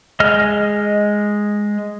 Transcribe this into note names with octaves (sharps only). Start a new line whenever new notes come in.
G#3 D#5 F6